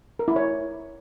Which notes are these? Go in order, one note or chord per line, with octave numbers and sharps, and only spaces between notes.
A#4
E4
C#5